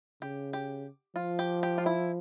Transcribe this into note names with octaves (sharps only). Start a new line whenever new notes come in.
C#3 G4
G4
F3 F4
G4
G4
F4
E4